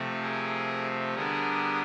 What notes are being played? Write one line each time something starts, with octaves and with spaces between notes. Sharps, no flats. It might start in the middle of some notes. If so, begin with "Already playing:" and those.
Already playing: C3 F3 A3 C4
G#4 A#4
D3 G3 B3 D4 G#4 A#4